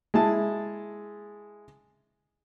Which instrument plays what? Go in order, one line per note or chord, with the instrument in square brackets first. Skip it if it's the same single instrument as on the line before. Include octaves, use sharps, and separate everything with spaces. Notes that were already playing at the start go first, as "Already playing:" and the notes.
[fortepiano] G#3 E4 A5